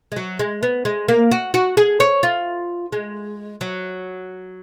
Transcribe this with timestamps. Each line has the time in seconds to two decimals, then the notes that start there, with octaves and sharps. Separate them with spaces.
0.12 G#3
0.16 F#3
0.39 G#3
0.63 B3
0.85 G#3
1.08 A#3
1.31 F#4
1.54 F#4
1.77 G#4
2.00 C#5
2.23 F4
2.92 G#3
3.61 F#3